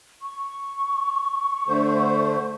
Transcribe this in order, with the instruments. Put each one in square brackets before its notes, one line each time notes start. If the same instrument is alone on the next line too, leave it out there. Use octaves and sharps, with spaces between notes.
[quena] C#6
[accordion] D3 A3 C5